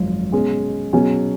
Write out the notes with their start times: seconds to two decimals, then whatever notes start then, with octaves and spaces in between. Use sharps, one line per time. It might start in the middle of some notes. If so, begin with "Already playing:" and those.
Already playing: G#1 F#2 F3
0.32 B2 G#3 C#4 G#4
0.93 B2 F#3 C#4 G#4